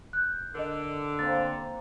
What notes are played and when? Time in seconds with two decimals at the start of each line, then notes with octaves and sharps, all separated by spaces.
0.13 F#6 G6
0.55 D3 A#4 D#5
1.19 A#3 C4 A6